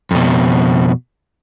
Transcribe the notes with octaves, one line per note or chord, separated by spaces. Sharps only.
F2 B2